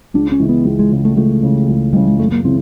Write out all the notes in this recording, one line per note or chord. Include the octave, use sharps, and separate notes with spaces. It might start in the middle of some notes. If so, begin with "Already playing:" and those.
C#2 D4
C#4
C#3 E3 G#3
B3
C#2
G#3
C#3 E3 G#3
A3
C#2 A3
C#3 E3 G#3
C#2
C#3 E3 G3 G#3
G#3
F#2 A3
A#3
C#3 E3 C4